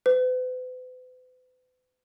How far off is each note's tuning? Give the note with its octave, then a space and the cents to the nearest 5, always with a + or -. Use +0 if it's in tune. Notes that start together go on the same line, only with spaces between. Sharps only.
B4 +45